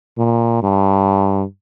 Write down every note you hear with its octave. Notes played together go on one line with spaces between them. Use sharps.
A#2
G2